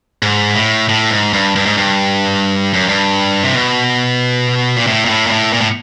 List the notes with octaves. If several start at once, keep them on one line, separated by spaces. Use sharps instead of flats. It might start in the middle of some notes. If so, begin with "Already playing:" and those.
G#2
A2
A2
G#2
G2
G2
G#2
G2
F#2
G2
C3
B2
A#2
A2
A#2
A2
A#2
A2
A#2
A2